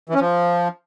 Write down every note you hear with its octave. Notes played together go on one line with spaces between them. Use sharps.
E3
C#4
F3